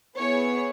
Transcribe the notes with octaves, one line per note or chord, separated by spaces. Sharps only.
B3 E4 G#4 C#5